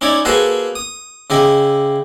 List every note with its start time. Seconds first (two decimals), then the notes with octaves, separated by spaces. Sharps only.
0.01 C#4 D#4 E4 C#5 D5
0.25 A#3 F#4 G#4 A4 B4 C5
0.76 D#6
1.30 C#3 E4 G4 D#5